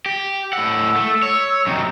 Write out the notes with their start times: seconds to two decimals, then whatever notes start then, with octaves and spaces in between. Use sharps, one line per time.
0.06 G4
0.53 A2 F#5 E6
0.96 A3
1.23 C#5
1.67 F#2 C3 D#4